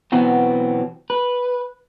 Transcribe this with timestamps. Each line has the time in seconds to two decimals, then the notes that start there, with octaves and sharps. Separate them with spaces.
0.12 B2 E3 F#3 B3 C4
1.10 B4